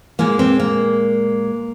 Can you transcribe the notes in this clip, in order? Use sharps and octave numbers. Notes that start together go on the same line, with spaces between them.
A#2 G#3 A#3
C4
A#3